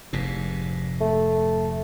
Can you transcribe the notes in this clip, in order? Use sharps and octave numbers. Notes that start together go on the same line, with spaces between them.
F1 G#2 C3
A3